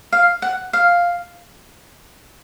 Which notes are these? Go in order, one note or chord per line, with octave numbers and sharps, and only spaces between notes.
F5
F#5
F5